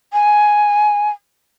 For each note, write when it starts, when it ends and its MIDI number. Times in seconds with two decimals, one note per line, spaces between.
0.13 1.09 80